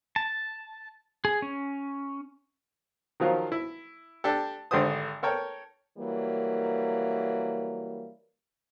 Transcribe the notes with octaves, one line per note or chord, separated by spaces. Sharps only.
A5
G#4
C#4
D#3 F3 F#3 F4
E4
D4 G4 A4
G#1 D3 D4 G4 C5 D#6
A4 A#4 C#5 G5
E3 F#3 G3 A#3